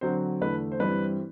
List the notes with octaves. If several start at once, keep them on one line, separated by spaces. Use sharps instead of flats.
D3 F#3 C4 C5
E2 D3 A3 B4
C5
G2 E3 G3 C4 B4